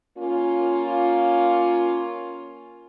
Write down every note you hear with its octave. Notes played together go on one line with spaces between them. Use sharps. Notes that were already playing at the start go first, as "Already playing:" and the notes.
A#3 C#4 F4